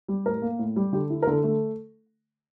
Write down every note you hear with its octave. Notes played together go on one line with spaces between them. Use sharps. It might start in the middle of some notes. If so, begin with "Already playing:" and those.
G3
A2 A#4
A#3
A2
G3
D3 G4
E4
A#4
D3 A4
A3